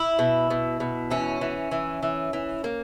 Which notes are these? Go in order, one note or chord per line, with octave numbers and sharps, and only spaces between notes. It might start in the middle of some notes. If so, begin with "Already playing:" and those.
Already playing: E4
B2
B2
B2
E3 C#4
E3
E3
E3
E3
A#3